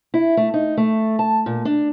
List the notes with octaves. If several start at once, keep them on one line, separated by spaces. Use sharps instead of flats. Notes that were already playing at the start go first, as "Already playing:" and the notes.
E4
A3
D#4
A3
A5
A#2
D4